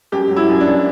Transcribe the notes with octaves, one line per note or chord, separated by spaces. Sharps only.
F#2 G4
F#3
E4
F#2
D4
F#2